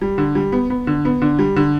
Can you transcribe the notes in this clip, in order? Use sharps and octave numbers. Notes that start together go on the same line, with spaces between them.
G3
D3
G3
B3
B3
D3
B3
D3
G3
D3